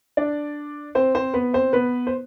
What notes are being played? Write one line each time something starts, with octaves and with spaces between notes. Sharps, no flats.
D4 D5
C4 C5
C4 C5
B3 B4
C4 C5
B3 B4
C5